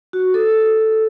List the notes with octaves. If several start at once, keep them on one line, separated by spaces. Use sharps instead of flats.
F#4
A4